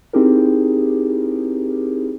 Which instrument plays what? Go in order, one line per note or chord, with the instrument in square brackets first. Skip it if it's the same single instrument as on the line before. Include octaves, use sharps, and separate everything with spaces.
[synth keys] C4 D#4 E4 G4 G#4 A#4